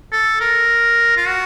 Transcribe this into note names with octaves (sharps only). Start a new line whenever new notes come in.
A4
A#4
F4
F#4